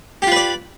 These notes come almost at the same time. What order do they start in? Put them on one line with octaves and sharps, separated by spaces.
G4 F4 B4 D5